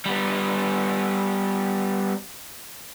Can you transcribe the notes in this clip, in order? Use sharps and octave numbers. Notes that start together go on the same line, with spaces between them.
G3 B3